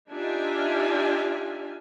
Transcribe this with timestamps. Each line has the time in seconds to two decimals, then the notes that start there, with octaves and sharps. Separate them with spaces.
0.12 D4 D#4 F4 G4 E5 G#5